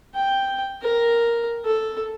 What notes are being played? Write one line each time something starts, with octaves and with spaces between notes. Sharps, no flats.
G5
A#4
A4